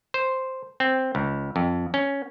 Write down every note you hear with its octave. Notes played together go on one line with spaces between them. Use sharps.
C5
C4
C#2
F2
C#4